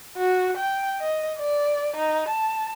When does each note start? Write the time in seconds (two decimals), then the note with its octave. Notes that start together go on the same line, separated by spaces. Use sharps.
0.17 F#4
0.58 G5
1.01 D#5
1.38 D5
1.96 D#4
2.29 A5